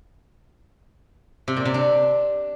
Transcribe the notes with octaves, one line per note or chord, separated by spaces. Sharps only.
C3
A#2
C3
D4